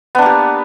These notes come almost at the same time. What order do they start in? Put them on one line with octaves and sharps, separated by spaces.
B3 D4 A#3 G4